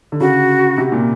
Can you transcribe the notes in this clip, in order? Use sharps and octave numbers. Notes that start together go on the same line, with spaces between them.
D3
C#3 F#4
C3
A#2